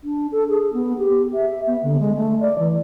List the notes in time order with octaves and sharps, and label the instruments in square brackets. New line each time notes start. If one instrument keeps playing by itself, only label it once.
[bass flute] D4
A4
G#4
B3
G4
E5
B3
D3
G#3
A3
D5
E3